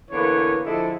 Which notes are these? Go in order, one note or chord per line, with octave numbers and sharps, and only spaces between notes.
D3 E3 A#3 B3 B4 C#5
D3 F3 G#3 E4 A4